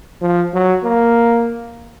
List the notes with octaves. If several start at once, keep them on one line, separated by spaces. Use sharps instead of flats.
F3
F#3
A#3